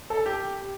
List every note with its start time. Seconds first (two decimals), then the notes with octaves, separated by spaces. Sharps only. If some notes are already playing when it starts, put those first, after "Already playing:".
0.10 A4
0.26 G4